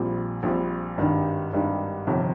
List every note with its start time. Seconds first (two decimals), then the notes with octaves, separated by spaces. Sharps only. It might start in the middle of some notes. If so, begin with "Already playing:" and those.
Already playing: A#1 A#2 G3 C4
0.43 A#1 A#2 G3 C4
0.97 G#1 G2 D#3 G3 D4
1.53 G#1 G2 D#3 G3 D4
2.07 G1 F2 C3 D#3